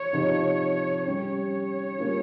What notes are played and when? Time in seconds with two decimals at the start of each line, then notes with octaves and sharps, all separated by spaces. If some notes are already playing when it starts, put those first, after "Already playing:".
Already playing: C#5
0.12 C3 F3 C4 D#4
1.05 G3 C#4 G4 C#5
1.99 G3 A#3 C#4 F4